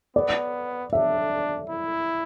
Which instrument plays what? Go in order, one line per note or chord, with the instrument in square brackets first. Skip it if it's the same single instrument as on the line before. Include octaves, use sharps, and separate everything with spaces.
[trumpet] B3 [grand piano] D5
[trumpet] D4 [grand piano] E5
[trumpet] E4